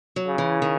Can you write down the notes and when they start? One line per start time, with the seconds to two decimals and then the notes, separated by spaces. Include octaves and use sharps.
0.16 F#3
0.27 C#3
0.38 E3
0.62 D#3